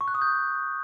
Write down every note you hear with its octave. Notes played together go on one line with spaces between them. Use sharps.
C#6
F#6
D#6
G6